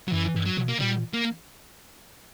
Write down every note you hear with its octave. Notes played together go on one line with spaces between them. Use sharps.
F#3
F#2 E3
G2
F#3
B2
A#3
A#2 G3
A#3